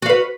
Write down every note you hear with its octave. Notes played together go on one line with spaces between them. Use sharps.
F#4 B4 F5